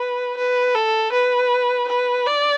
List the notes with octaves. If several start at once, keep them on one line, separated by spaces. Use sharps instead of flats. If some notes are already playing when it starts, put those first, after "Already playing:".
Already playing: B4
B4
A4
B4
B4
D5